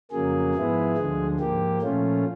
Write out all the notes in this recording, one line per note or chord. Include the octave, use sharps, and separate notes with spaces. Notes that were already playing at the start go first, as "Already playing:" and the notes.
F2 C#3 F#3 A#3 G#4
G#2 F3 G#3 B3 E4
D2 D3 F3 G#3
G#2 F3 A#3 G4
A#2 F3 A3 C#4 F4